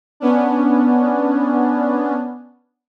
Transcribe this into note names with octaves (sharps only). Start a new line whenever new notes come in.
B3 C#4 D4